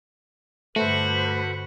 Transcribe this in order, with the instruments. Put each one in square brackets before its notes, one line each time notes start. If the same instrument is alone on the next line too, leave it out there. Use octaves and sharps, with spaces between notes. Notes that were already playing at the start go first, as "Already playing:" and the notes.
[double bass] G2 D3 [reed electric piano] A3 [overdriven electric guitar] F#4 [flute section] A4 B4 C5